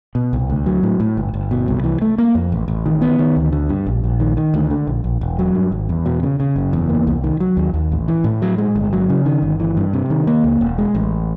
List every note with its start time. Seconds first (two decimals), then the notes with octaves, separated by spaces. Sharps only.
0.15 B2
0.33 C2
0.50 D2
0.66 F#3
0.83 A2
1.00 A2
1.17 G1
1.34 G1
1.51 B2
1.68 C2
1.84 E3
2.02 A3
2.18 A#3
2.35 F2
2.52 A1
2.68 A1
2.86 D#3
3.02 B3
3.19 D#3
3.36 D2
3.52 D3
3.69 G2
3.87 A#1
4.04 A#1
4.20 D#3
4.37 D#3
4.54 D2
4.70 D3
4.87 A#1
5.04 A#1
5.21 E1
5.39 F#3
5.55 G2
5.72 G#1
5.89 E2
6.06 B2
6.23 C#3
6.40 C#3
6.56 F#1
6.73 E2
6.89 A#3
7.07 C2
7.24 D#3
7.40 F#3
7.57 D#2
7.74 D#2
7.92 A1
8.08 E3
8.24 A2
8.42 F#3
8.58 G#3
8.76 G1
8.93 F#3
9.10 C#3
9.25 D#3
9.42 G1
9.60 E3
9.77 G2
9.93 C3
10.10 D#3
10.27 A#3
10.44 C#2
10.61 E1
10.78 G#3
10.95 A1